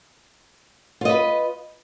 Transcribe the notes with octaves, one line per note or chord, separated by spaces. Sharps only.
F4 B4 D#5